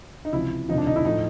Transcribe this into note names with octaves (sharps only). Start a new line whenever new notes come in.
D#4
C#2 C3 F3 E4
E1 D2 C3 F3 D#4
D4
D#4
E4
A2 F3 D#4